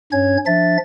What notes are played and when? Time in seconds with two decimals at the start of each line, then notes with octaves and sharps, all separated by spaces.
0.12 G2 C#4 C#5 G#6
0.46 F3 D4 E5 A6